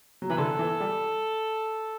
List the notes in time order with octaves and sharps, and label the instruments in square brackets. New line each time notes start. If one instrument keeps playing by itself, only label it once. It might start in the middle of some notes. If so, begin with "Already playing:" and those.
[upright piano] F#3
[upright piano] E3 [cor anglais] B4
[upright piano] D3 [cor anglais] A4
[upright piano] E3
G3